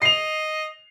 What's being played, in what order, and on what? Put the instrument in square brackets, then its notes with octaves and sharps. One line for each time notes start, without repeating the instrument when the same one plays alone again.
[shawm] D#5 [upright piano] C7 F7